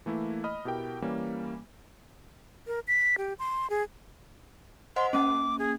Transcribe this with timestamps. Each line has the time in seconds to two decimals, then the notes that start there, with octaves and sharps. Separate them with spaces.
0.06 E3 A3 A#3 E4
0.44 D#5 B5 D#6 F6
0.65 B2 E4 G4 A#4 G5
1.02 E3 G3 A#3 C#4
2.67 A#4
2.88 B6
3.18 G4
3.39 C6
3.70 G#4
4.96 C5 D#5 F#5 C6
5.13 A#3 C#4 D6
5.59 G#4